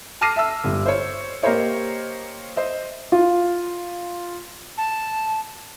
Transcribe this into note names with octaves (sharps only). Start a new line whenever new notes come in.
A5 D6 F6 A#6 C7 D#7
E5 A5 E6
G1 G3
C5 C#5
A#3 G4 A#4 C5 C#5 D#5
C5 D#5 E5
F4
A5